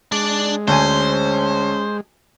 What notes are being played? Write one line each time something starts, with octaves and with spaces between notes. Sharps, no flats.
G#3 D4 D5
D2 C#4 C5 G#5